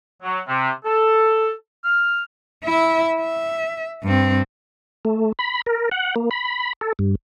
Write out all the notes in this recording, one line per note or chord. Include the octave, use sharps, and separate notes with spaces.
F#3
C3
A4
F6
E4 E5
E5
G2 C4
A3
B5
A#4
F#5
A#3
B5
A4
G2